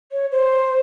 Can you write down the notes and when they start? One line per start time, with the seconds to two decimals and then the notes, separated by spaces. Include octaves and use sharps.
0.12 C#5
0.31 C5